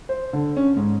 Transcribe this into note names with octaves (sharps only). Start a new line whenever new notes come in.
C5
D3
C#4
G#2